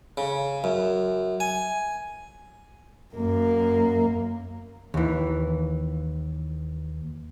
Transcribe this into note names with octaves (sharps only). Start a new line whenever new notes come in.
C#3
F#2
G#5
F#2 A#3
D#2 E3